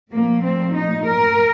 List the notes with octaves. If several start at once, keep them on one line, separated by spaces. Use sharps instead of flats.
A#2 F3 A3 A#3
C4
D#4
A#4